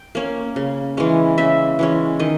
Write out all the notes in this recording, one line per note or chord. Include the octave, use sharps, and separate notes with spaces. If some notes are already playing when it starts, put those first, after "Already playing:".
Already playing: G5
A#3 C#4
C#3
E3 G#3 C#4
C#3 E5
E3 G#3 C#4
D#3 D#5